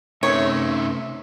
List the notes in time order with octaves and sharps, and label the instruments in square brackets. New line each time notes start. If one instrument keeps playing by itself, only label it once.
[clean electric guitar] C3 A3 [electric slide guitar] C#4 D#4 B4 [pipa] C#5 [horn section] E5